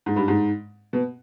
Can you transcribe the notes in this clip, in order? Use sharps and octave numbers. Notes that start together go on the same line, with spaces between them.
G#2
G2
G#2
B2